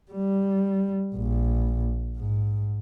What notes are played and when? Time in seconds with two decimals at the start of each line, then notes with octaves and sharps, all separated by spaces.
0.12 G3
1.15 A#1
2.17 G#2